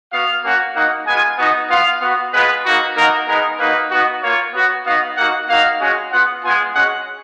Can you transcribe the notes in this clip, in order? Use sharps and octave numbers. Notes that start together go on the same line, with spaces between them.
B3 F#4 F5
A#3 C#4 F#4
A#3 D#4 F#4 F#5
G#3 B3 F4 G#5
B3 D#4 F#4
B3 F4 F5
B3 F#4
G#3 B3 F4 B4
A#3 D#4 F#4
A#3 D#4 F#4 A#4
G#3 B3 D#4 A#4
A#3 D#4 F#4 B4
B3 D#4 F#4
A#3 F4 C#5
B3 F#4
B3 D#4 F#4 F5
A#3 D#4 F#4 F#5
A#3 D#4 F#4 F5
G#3 C#4 F#4
B3 F4 F#5
G#3 B3 F4 G#5
G#3 C#4 F#4 F#5